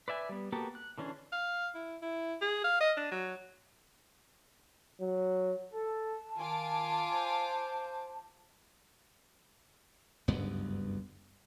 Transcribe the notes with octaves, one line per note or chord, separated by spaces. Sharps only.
B4 D5 E5 G#5
G3 B3
A#3 B3 F#4 G4 A4
F#6
D3 E3 C#4 D4 G#4
F5
E4
E4
G#4
F5
D#5
D4
F#3
F#3
A4 A5
D#3 F4 G#5 D6
C5
F#1 D2 G2 B3